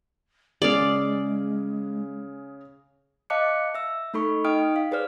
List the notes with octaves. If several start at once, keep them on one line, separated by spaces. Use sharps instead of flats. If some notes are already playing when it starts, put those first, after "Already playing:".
C#3 G#3 G#4 D5 F5
D#5 F5 A5 D6 F#6 C#7
E5 E6
A3 D#4 A4 B5 C#6
D#4 D#5 G5 D#6 F6 D7
F5
G#4 B4 C5 D5 F6